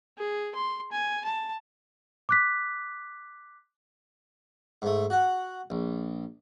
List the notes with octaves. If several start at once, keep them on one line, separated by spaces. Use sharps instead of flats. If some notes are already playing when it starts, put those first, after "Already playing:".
G#4
C6
G#5
A5
D6 F#6 B6
G#2 A3
F#4 F#5
A#1